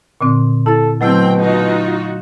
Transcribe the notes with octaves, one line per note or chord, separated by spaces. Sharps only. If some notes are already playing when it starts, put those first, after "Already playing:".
A#2 D3 C4
E4 A4 A6
B2 F#3 A3 C4 E4 G5
D#4 F4 F#4